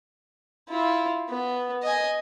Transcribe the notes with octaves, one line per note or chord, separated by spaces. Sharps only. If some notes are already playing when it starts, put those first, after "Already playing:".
E4 F4
B3
D#5 G#5